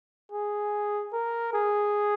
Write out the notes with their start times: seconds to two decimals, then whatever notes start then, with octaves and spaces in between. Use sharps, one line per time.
0.32 G#4
1.13 A#4
1.53 G#4